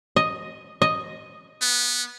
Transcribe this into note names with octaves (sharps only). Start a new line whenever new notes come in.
D#5
D#5
B3